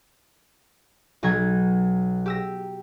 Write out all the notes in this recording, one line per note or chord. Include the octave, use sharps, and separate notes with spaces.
B1 F#3 A#5 G#6
G4 E6 A#6